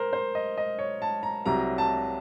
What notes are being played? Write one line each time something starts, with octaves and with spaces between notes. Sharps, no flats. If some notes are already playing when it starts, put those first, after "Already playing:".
Already playing: A#4 C5
C5
D#5
D#5
C#5
A5
A#5
C2 C3 F#3 A#5
A5